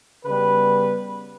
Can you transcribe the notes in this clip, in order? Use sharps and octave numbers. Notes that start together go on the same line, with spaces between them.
C#3 G3 B3 B4